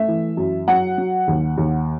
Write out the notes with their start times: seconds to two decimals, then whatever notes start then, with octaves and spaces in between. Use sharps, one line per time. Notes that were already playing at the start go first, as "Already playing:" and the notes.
Already playing: A3 E5
0.08 E3
0.37 F#2
0.68 F#3 F#5
0.98 F#3
1.27 D#2
1.57 D#2